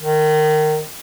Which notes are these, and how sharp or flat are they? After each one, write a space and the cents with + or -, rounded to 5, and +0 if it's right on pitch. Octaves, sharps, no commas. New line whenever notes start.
D#3 -20